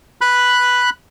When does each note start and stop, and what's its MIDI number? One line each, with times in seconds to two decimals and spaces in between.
0.21 0.90 83
0.21 0.90 90